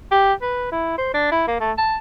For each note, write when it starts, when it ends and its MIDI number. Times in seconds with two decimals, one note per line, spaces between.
0.11 0.33 67
0.41 0.69 71
0.72 0.97 64
0.98 1.13 72
1.14 1.31 62
1.32 1.46 64
1.48 1.58 58
1.60 1.72 57
1.78 1.96 81